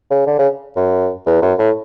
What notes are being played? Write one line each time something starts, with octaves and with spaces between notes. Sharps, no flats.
C#3
D3
C#3
F#2
E2
F#2
A2